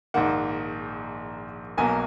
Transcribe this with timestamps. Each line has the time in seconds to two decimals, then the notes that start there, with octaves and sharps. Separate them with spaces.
0.14 A#1 G#2 D#3 A#3 F#5
1.78 B1 B2 F#3 A#3 G#5